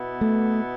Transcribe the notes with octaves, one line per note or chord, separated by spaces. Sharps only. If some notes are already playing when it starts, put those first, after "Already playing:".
Already playing: B2 B3 E4
A3